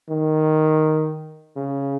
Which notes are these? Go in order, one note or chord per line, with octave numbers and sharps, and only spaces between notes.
D#3
C#3